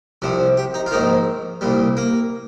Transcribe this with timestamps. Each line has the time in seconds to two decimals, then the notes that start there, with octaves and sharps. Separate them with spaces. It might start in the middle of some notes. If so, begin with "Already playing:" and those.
0.22 C2 C3 F3
0.57 G4
0.74 D#4
0.86 F4
0.91 A#1 G#2 D#3 D#4
1.61 C2 A#2 G3
1.97 A#3